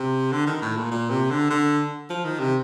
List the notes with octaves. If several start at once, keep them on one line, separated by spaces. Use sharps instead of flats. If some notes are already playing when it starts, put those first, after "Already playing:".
Already playing: C3
D3
D#3
A2
A#2
A#2
C3
D3
D3
F3
D#3
C3